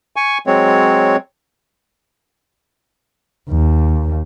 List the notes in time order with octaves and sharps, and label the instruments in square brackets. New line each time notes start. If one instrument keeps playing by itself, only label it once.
[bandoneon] G#5 C#6
F#3 G#3 C4 C#5
[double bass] D#2